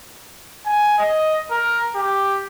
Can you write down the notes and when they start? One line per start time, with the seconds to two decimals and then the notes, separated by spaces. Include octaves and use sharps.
0.66 G#5
0.98 D#5
1.51 A#4
1.95 G4